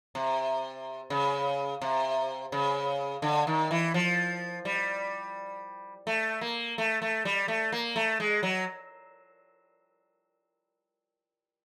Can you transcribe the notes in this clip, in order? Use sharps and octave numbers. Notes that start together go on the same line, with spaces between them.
C3
C#3
C3
C#3
D3
D#3
E3
F3
G3
A3
A#3
A3
A3
G3
A3
A#3
A3
G#3
F#3